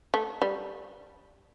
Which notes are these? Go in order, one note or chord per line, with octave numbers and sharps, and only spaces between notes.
A3
G3